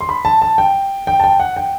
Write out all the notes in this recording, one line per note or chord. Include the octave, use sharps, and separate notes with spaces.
C6
B5
A5
A5
G5
G5
A5
G5
F#5
G5